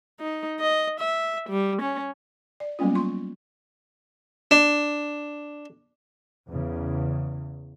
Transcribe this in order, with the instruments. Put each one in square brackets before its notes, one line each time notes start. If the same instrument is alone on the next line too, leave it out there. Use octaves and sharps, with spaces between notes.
[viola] D#4
D#5
E5
G3
C#4
[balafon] D5
F#3 G3 A#3 B3 C#4 F4
F4 C6 C#6
[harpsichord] D4
[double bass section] E2 C#3